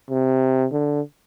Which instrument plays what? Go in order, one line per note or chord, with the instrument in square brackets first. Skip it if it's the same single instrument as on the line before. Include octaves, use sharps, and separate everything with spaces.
[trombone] C3
D3